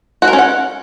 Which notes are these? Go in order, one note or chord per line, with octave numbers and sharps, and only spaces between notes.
F#4
A#4
C#4
F#5